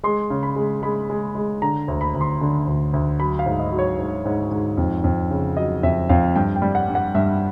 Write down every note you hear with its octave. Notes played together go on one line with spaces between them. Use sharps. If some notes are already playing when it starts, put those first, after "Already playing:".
G#3 C6
C#3
B5
G#3
G#3 B5
G#3
G#3
D3 A#5
D2
B5
D2
C6
D3
D2
D2
F#3 B5
F5
G#2
D#5
F#3
C#5
G#2
G#2
G#2
F2
F2
C#3
F#3 D#5
F2 E5
F2 F5
G2 G5
G5
G3
F#5
G2
F#5
G2 E5